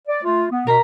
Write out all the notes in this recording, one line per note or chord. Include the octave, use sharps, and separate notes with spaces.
D5
A3 F4
B3
B2 A#4 A#5 B6